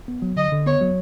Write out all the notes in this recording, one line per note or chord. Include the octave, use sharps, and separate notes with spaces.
B3
F#3
D3 D#5
D3
B3 C#5
F#3